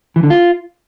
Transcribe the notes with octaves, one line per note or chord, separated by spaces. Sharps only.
E3
D3
F4